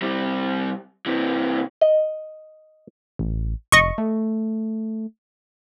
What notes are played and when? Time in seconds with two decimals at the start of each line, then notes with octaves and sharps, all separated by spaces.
0.02 C3 G3
1.06 C3 E3
1.81 D#5
3.19 A1
3.72 F1 D#5 C#6
3.98 A3